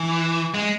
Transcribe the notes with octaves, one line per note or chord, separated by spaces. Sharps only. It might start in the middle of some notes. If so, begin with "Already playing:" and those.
Already playing: E3
G#3